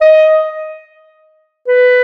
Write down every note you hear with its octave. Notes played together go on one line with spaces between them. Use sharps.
D#5
B4